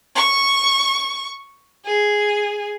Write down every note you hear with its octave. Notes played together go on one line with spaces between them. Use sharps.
C#6
G#4